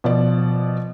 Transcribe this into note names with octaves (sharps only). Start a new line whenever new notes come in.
B2 F3 D5